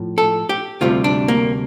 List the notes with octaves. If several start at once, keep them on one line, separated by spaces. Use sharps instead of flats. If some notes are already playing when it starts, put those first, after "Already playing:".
Already playing: A2 F3
A4
G4
D2 C3 G3 F4
D4
A#3